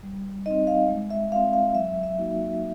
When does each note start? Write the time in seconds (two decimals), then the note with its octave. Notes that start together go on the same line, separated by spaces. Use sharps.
0.03 G3
0.46 C4 D#4 D#5
0.67 F5
0.89 G#3
1.10 E5
1.32 C4 F4 F5
1.53 F5
1.75 F#3 E5
2.03 E5
2.18 A#3 D#4 F#4